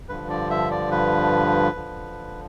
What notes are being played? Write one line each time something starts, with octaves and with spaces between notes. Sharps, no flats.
G2 D3 F3 B4
D5
E5
D5
B4
D3 F3